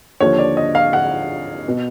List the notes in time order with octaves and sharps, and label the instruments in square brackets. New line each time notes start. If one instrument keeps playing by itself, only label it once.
[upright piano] D#2 D3 F3 C#5
D5
D#5
F5
F#5
B2